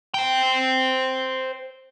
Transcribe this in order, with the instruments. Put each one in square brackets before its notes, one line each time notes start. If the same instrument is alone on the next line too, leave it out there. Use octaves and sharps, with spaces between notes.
[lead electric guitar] C5 G5